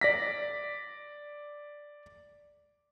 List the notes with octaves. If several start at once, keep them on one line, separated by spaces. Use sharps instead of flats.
D5 A#6 B6